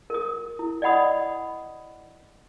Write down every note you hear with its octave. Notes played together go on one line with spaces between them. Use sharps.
A#4 D#6
E4
D5 D#5 F#5 B5 D#6